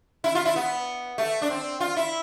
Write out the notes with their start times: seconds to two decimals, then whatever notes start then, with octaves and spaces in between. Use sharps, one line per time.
0.24 E4
0.35 F4
0.45 E4
0.56 B3
1.18 A3
1.42 D4
1.50 C4
1.80 F4
1.96 E4